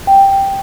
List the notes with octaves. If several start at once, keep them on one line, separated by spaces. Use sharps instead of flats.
G5